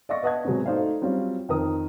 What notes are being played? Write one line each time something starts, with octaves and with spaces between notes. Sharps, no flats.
D5 D#5 F5 C#6 A#6
B4 D#5 F#5 A5 D#6 G#6
B2 F#3 G#3 B3 C4
A3 D#4 C5 D5 F5
F#3 G3 C4 C#4 F4
F2 D#3 A#4 D#6